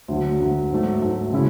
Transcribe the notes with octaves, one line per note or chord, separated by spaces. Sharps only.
D2 D3 F#3
D2 D3 F#3
G#2 F#3 A3
G#2 F#3 A3
C#3 G#3 C#4 E4